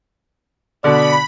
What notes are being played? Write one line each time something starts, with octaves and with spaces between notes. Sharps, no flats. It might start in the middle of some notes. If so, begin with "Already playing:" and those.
B2 D3 D5 B5